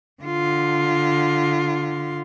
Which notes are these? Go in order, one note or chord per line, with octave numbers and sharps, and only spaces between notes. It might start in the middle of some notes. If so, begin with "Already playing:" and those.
D3 F4